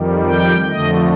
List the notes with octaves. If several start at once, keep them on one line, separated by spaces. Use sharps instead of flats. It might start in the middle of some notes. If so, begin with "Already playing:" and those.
Already playing: F2 D#3 G3
G5
F2 D3 A3 D#5